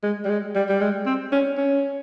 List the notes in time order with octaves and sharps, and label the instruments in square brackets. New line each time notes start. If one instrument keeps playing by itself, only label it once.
[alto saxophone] G#3
G3
G#3
G3
G3
G#3
C4
C#4
C#4